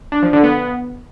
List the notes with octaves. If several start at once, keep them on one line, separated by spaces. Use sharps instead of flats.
D4
F3
D3
B3